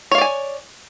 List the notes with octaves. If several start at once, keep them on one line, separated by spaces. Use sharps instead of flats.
C#5 D5 F5 G#5